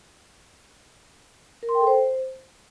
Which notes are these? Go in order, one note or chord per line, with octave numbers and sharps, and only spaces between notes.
A#4
C6
G5
A4
C5